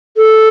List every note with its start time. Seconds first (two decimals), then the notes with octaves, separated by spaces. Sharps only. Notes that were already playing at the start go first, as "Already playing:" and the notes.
0.17 A4